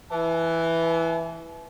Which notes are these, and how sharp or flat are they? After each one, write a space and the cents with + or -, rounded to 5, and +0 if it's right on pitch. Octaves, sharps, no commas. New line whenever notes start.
E3 +0 A5 -45